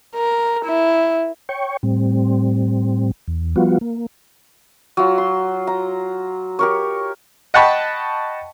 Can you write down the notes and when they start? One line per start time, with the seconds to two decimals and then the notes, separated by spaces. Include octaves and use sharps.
0.15 A#4
0.65 E4
1.49 C#5 G5 C#6
1.83 A2 G3 C4
3.28 E2
3.56 F3 G3 B3 F4 F#4
3.81 A#3
4.97 F#3 F4
5.18 C6
5.67 A#5
6.59 G4 A#4 C#5
7.54 D#5 F#5 G5 A5 B5 C#6